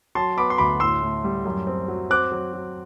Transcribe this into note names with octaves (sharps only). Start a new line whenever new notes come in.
F#3 A5 C6
B3 B5 D6
C6
D2 B5 D6
A2 C6 E6
A2
G3
F#2
C4
F#3
C4 D6 F#6
F#3
F#3